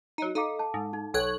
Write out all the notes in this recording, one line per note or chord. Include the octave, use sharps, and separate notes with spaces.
F#3 D#4
D#4 A4 F5 D6
A5
G#2
D#4
B1 A4 C#5 F#6